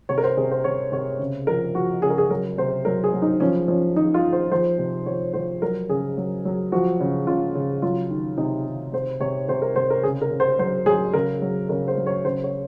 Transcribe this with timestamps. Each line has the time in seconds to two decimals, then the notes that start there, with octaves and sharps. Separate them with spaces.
0.09 C3 C#5
0.18 A#4
0.24 C5
0.37 C3 G#4
0.51 C5
0.64 C3 C#5
0.92 C3 C#5
1.19 C#3
1.47 F3 A#4
1.75 F3 F#4
2.02 C#3 G#4
2.10 A#4
2.18 G#4
2.30 F#3 A#4
2.58 C3 C5
2.85 F#3 A#4
3.04 G#4
3.13 F#3
3.22 D#4
3.40 F3 C#4
3.68 F3 C#4
3.96 F3 D#4
4.14 F4
4.23 F3
4.32 C5
4.51 F3 C5
4.78 C3
5.06 F3 C#5
5.33 F3 C5
5.62 F#3 A#4
5.89 C#3 G#4
6.17 F#3
6.45 F#3
6.72 F3 F#4
7.00 C#3
7.27 C#3 F4
7.55 C#3
7.82 F#3 F4
8.10 D#3
8.37 C3 D#4
8.66 D#3
8.93 C3 C5
9.20 C3 C#5
9.48 C3 C5
9.62 A#4
9.76 C3 C5
9.90 A#4
10.03 C#3 G#4
10.22 A#4
10.31 C#3
10.40 C5
10.59 F#3 C5
10.86 F#3 G#4
11.14 C#3 A#4
11.42 F#3
11.69 C#3 A#4
11.88 C5
11.97 F#3
12.06 C#5
12.24 C#3 C5
12.44 C#5